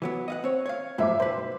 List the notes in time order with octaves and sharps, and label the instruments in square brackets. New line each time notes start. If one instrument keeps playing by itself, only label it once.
[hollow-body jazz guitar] E3 F#3 B3
D#5 F5 F#5
C4 C#5
C#5 F5
[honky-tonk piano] G1 E5 D6 [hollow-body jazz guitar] A2 F3 F#3
[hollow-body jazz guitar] B1 B4 [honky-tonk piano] C5